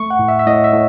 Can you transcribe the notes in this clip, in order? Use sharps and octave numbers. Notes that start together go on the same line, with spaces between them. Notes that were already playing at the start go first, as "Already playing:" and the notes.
Already playing: A3 C#6
F#5
A2
E5
E5
A2 D#5
E5
A2